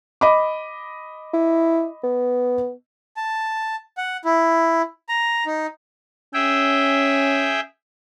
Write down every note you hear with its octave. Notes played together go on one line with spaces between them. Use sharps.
D#5 B5 D6
E4
B3
A5
F#5
E4
A#5
D#4
C#4 G#4 E5 G5